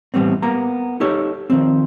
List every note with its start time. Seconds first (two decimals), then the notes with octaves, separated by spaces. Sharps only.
0.14 A2 E3 G3 B3 C4
0.42 A#3 B3 A#5
1.00 D#4 G4 A4 C#5
1.50 D#3 F3 C4